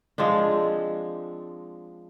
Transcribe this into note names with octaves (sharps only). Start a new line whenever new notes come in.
F3 G#3 C4 D4